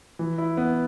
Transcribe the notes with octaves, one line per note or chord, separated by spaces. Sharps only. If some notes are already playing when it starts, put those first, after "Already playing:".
E3
E4
B3